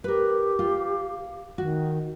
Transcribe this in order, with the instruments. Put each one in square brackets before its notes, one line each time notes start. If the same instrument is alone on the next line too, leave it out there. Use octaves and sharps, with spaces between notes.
[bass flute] G4 [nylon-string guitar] A#4 B4
[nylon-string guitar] F4
[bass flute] D#3 [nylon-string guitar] F#4